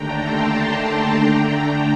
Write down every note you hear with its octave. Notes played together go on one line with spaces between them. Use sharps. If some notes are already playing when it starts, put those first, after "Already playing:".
Already playing: D#2 D3 A3 D4 G5 A#5
A5 C6
G5 A#5
D3 A3 D4 G5 A#5